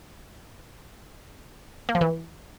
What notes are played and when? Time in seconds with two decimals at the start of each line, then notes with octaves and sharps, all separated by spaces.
1.89 A#3
1.95 F3
2.01 E3